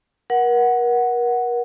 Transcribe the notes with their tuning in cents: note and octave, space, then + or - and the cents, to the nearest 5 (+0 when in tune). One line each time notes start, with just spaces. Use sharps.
A#4 +35 F#5 +0